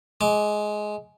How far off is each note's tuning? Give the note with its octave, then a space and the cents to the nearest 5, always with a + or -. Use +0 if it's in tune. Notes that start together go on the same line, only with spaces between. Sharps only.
G#3 +15 D6 +0